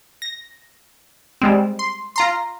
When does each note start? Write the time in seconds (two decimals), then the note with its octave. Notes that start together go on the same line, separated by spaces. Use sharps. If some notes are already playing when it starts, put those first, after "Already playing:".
0.22 A#6
1.41 G3 G#3 C4
1.79 C6
2.16 F4 A#5 C6